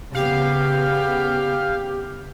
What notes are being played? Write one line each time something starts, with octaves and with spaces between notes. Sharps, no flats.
C#3 B3 G4 F5